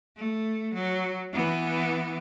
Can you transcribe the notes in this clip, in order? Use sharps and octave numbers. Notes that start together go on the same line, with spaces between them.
A3
F#3
E3 B3